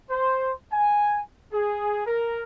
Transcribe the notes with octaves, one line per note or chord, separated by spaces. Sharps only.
C5
G#5
G#4
A#4